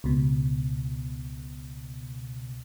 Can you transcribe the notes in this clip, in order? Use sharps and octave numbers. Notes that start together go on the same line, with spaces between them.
C#2 B2